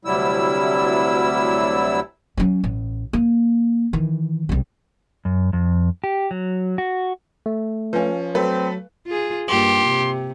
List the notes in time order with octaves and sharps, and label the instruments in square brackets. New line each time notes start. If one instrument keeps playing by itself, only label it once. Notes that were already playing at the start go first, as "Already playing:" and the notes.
[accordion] D2 C3 F#3 G3 E4 E6
[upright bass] F#3 C#4
A1
A#3
D#3 E3
C2 C#3
[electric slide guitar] F#2
F2
G4
F#3
F#4
[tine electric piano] A3
[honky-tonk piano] F3 C#4 [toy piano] B4 F5 G#5
[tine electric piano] F#3 [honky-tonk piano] A3 A4 B4 [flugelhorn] C4 [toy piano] F5
[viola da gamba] F4 G#4
[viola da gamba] G2 A#3 F4 [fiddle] G4 [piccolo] C6
[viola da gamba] C3